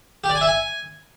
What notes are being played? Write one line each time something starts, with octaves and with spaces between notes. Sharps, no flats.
G4
D5
G#5
E5
G#5